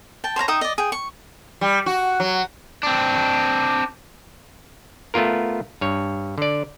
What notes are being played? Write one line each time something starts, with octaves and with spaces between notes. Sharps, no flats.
G5 A5
C5 C#5 F5 A#5
D#4 E5 G5 D#6
D5 D#5
G#4 G5
C#6
G3
F#4
F#3
C4 D4
A3 B3 F4 A#4
G2 C#5
D3 D5